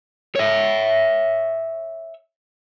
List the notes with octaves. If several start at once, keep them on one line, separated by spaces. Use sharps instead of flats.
C#5 E5